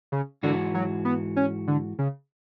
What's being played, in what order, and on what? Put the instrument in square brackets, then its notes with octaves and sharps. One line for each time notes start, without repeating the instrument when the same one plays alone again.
[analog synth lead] C#3
[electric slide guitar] G#2 E3 F#4 [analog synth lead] D3
[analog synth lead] F#3
B3
C#4
D3
C#3